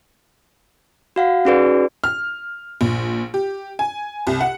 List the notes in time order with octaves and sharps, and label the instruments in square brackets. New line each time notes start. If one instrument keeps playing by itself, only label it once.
[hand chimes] F#4 F5 F#5
C#4 D#4 F#4 G#4 B4 D5
[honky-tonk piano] F6
A#1
G4
G#5
C2
F#5